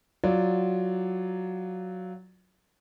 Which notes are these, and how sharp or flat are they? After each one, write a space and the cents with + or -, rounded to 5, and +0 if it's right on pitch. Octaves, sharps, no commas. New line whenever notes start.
F#3 +0 F4 +0 D5 +0